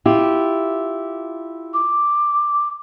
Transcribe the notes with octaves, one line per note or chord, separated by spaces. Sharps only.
E4 F4 G4
D6